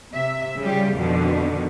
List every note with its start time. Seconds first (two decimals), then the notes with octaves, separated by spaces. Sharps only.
0.11 C3 E5
0.60 C#3 G3 F4 G4
0.95 F2 B2 D3 D#3